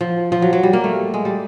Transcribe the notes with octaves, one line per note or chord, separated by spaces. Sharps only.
F3
F3
F#3
F#3
G3
A#3
A3
G#3
G3